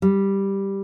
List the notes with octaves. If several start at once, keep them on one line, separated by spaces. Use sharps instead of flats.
G3